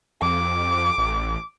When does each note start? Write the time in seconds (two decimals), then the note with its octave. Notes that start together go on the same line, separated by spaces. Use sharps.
0.22 F2 D6
0.98 A1